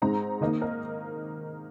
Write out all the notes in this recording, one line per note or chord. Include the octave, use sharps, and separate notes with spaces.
G#2 G#3 C4 D#4 A#5
D#3 A#3 D#4 D#5
A#4